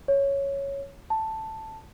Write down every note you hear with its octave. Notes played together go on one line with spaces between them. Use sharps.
C#5
A5